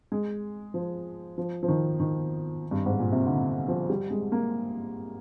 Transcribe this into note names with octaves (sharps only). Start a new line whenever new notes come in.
G#3
F3
F3
F3
D#3
D#3
G2
G#2
A#2
C3
D3
F3
G3
G#3
A#3